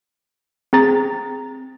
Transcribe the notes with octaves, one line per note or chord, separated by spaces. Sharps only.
C4 G#4 A#5 A6